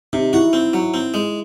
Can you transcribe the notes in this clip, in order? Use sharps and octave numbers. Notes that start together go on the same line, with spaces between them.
C3 D#4
E4 F#4
C4
F#3
C4
G#3